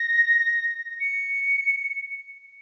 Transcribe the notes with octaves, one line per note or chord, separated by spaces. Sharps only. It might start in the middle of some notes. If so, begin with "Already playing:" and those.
Already playing: A#6
C#7